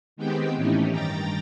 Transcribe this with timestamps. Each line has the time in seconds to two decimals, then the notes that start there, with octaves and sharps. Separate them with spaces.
0.17 D#3 G#3 B3 C4 G4 G5
0.55 A2 E3 A3 C#4 D#4 G4
0.91 G2 D#3 G5 A#5 A6